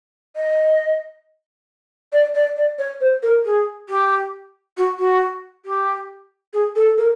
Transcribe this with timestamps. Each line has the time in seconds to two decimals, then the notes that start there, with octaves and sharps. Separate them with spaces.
0.36 D#5
2.12 D5
2.34 D5
2.56 D5
2.78 C#5
3.01 C5
3.23 A#4
3.45 G#4
3.89 G4
4.77 F#4
4.99 F#4
5.65 G4
6.53 G#4
6.75 A4
6.98 A#4